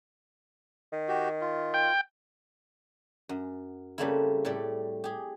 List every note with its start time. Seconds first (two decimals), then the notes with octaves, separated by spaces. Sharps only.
0.93 D#3
1.08 F#4 G4
1.41 F4
1.74 G5
3.29 F#2
3.98 C#3 G3 A3 A#3 C4 E4
4.45 A2 G3 A3 A4 D5
5.04 G4 G#4